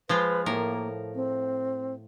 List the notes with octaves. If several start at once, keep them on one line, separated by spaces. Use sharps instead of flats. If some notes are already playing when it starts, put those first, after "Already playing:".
F3 G#3 F4 B4
A2 A#3 A#4
C4